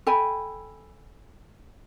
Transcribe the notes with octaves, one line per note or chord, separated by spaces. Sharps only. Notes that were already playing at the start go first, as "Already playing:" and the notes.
A4 G5 G#5 B5